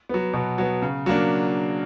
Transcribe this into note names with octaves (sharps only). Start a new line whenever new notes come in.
F#3 B3
B2
F#3 B3
C#3
F#3 A#3 D4